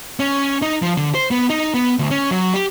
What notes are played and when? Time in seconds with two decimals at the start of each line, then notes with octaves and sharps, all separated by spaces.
0.20 C#4
0.62 D#4
0.82 F3
0.97 D3
1.15 C5
1.31 B3
1.50 D#4
1.74 B3
1.99 D2
2.11 C#4
2.31 F#3
2.54 G4